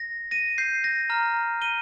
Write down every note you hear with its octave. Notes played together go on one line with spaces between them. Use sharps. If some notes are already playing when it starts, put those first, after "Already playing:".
Already playing: A#6
A#6 D#7
G6 C7
A#6
A#5 F6
D#7 G7